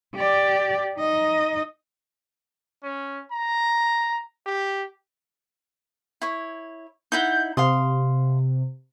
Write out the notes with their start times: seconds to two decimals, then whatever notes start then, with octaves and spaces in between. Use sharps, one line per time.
0.16 G4 D5
0.98 D#4 D#5
2.83 C#4
3.32 A#5
4.46 G4
6.22 E4 C#5
7.12 D#4 E4 F#5 G6
7.57 C3 F5 C6 D#6